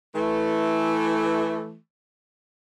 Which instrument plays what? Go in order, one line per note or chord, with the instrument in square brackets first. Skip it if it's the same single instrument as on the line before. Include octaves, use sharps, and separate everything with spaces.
[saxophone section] E3 A3